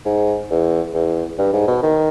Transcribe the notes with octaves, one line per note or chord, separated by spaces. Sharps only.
G#2
E2
E2
G2
G#2
B2
D#3